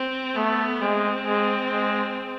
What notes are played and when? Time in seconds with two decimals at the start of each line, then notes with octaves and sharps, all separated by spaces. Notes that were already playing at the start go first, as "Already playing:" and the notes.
Already playing: C4
0.36 A3 B3
0.81 G#3 C4
1.26 G#3
1.72 G#3